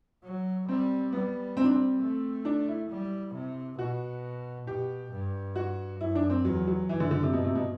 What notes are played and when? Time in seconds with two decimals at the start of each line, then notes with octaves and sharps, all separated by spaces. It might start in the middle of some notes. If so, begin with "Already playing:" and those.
0.24 F#3
0.68 G3 C4
1.13 G3 B3
1.57 C4
1.64 D4
1.71 C4
2.01 A3
2.45 D4
2.68 E4
2.90 G3
3.34 C3
3.78 B2 F#4
4.67 B2 G4
5.12 G2
5.56 F#4
6.01 F#2 E4
6.15 D4
6.30 C4
6.44 E2 F#3
6.67 F#3
6.88 F#2 E3
7.00 D3
7.11 D3
7.23 C3
7.33 G2 B2
7.44 C3
7.55 B2